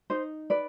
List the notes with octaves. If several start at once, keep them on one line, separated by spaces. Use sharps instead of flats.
D#4 C5
B4 D5